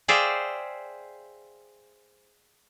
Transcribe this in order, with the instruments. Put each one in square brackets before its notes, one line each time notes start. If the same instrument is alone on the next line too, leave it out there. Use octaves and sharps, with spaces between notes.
[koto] G#4 C5 D5 E5 F5 G5